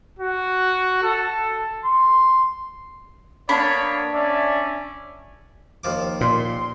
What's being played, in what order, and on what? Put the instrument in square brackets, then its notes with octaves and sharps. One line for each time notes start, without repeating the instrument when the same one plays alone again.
[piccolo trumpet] F#4
A4
C6
[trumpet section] A#3 B3 C#5 [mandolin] D4 B5
[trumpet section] C#4 D5 E5
[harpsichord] D#2 F3 D6
[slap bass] A#2 [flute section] C6